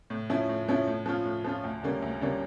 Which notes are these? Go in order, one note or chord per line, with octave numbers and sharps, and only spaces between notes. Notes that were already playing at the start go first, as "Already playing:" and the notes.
A2
F3 C#4 E4
A2
F3 C#4 E4
A2
F3 C#4 F4
A2
F3 C#4 F4
D2
D3 G3 A#3 C#4
D2
D3 G3 A#3 C#4